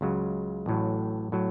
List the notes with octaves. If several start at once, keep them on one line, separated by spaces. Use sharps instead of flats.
C#2 C#3 F#3
A1 A2 F#3
A2 F#3